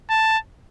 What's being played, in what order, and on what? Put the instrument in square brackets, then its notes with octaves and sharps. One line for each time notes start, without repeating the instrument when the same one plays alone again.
[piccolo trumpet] A5